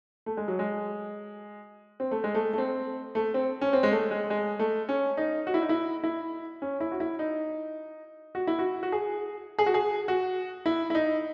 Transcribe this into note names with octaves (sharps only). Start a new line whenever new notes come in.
A3
G#3
F#3
G#3
C4
A3
G#3
A3
A3
C4
A3
C4
C#4
C4
G#3
A3
G#3
G#3
A3
C#4
D#4
F#4
E4
D#4
E4
E4
C#4
E4
F#4
E4
D#4
F#4
E4
F#4
F#4
G#4
G#4
F#4
G#4
F#4
E4
E4
D#4